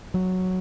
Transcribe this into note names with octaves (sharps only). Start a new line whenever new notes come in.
F#3